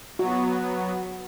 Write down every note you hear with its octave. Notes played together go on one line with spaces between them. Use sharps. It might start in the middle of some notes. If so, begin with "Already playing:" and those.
F#3 B3 F#4